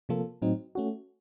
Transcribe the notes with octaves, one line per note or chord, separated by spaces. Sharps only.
C3 F3 A#3 F4 A4
A2 F#3 C4 D#4
A3 C#4 F#4